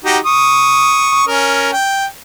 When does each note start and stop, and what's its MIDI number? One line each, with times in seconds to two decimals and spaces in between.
0.04 0.18 63
0.04 0.18 66
0.04 0.18 67
0.26 1.26 85
0.26 1.26 87
1.27 1.71 61
1.27 1.71 70
1.72 2.06 79